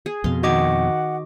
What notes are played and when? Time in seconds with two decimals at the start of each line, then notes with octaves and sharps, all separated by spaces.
0.06 G#4
0.24 F2 B2 F5 C6
0.43 D#3 D#4 F#4 C#5 D#5 F#5 D6